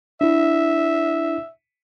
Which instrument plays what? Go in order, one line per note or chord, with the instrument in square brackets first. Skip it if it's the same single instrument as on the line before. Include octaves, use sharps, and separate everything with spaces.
[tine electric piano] D4 E4 [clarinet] E5